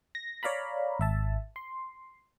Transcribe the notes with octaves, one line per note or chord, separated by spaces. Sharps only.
A#6
C#5 D5 F5 A#5 B5
G#1 E5 A5
C6